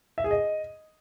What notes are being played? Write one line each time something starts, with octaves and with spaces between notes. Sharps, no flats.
E5
G#4
D#5